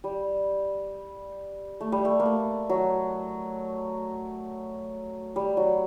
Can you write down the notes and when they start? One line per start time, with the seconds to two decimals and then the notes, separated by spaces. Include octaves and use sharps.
0.04 G3
1.81 A3
1.92 G3
2.05 A3
2.20 A#3
2.26 A3
2.69 F#3
5.36 G3
5.57 F#3